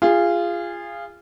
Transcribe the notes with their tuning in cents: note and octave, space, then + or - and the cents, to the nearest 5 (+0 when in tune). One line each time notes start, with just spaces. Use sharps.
F4 -15 G#4 -25